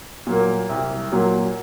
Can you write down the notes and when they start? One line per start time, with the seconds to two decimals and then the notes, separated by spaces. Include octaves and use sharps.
0.27 A#2 F#3 A#3
0.69 C2
1.12 A#2 F#3 A#3